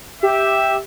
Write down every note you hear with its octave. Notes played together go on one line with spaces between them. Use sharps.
G4 E5